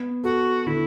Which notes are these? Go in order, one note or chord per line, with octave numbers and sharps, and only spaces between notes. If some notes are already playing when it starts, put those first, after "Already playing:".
Already playing: B3
F#4 A4
D3 E4